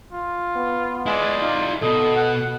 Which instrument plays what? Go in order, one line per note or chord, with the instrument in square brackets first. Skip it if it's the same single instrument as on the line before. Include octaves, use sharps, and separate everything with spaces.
[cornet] F4
[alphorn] B3
[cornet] G#3 [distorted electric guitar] E4 D5
[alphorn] D#4 [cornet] F4
[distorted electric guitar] B2 [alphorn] A4 [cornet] D#5
[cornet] F#5